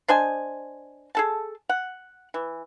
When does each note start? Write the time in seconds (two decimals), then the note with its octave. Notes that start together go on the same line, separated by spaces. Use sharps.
0.08 D4 C5 D#5 G#5
1.15 G#4 A4 A5
1.69 F#5
2.34 E3